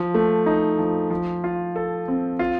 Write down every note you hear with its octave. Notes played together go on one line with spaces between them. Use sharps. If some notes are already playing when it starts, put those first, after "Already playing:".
Already playing: F3
A3
D#4
F3
F3
F4
A4
C4
F4